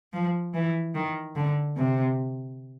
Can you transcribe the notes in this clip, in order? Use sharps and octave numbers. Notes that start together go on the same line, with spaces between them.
F3
E3
D#3
D3
C3